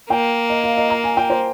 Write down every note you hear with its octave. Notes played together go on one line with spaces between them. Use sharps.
A#3 G5
D#5
F5
D#5
A#5
G#5
G5
C5